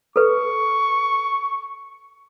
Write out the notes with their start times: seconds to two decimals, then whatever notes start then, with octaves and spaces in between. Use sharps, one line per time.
0.16 A4 B4 C#6